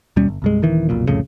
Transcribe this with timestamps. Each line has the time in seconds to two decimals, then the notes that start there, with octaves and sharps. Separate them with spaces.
0.16 D#2 B2 G3 C#4
0.28 G1
0.42 C2 G2 G#3
0.62 D#1 D#3 E3
0.89 F1 B1 A#2
1.08 C2 F2 A2 C#3